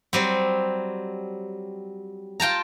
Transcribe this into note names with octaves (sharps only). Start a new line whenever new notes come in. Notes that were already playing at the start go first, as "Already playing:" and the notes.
F#3 G3 C4
F4 G5 A5 A#5